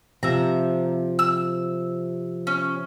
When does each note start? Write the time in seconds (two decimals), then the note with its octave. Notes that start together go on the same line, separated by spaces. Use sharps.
0.23 C3 F3 E5 A#5
1.19 E6
2.47 C#4